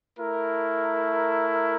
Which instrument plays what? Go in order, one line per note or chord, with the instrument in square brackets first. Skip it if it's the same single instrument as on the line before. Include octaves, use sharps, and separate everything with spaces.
[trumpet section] A3 E4 A#4